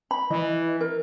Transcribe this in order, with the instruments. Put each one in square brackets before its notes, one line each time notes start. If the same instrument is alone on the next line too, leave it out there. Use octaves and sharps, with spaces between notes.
[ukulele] B5
[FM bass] E3 [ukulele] D#5
[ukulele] A#4